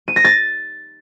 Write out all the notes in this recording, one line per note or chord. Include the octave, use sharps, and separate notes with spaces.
D#7
A#6
A6